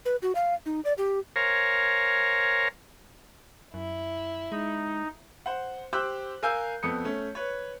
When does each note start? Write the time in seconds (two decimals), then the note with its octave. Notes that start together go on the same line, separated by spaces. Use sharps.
0.05 B4
0.22 F#4
0.35 F5
0.66 D#4
0.85 D5
0.98 G4
1.36 A#4 C5 C#5 F5 G#5 A#5
3.74 F#2 E4
4.52 G#3 D#4
5.46 C5 F#5
5.93 G4 C5 G5 D6 E6 F#6
6.43 A#4 F5 G#5 E6 G6
6.83 F2 B3 A4 D#6 C#7
7.05 A3 C#4
7.35 B4 C#5